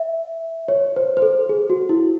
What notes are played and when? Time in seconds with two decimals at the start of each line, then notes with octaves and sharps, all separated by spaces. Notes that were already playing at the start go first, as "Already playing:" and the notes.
Already playing: E5
0.68 C#5
0.96 C5
1.17 C5
1.22 A4
1.49 G#4
1.70 F#4
1.89 E4